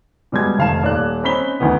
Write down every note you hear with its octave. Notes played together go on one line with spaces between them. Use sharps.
B2 G3 G#3 G#6
F1 D#3 F5 A5 E7
D#1 D5 F#6
C4 C#4 D#4 B5 B6 G7
D2 D#3 E3 B3